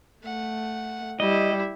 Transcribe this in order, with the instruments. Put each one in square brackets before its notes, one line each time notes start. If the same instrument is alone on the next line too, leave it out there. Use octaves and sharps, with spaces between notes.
[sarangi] A3 [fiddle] F#5
[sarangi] G3 [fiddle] E4 [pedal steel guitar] D#5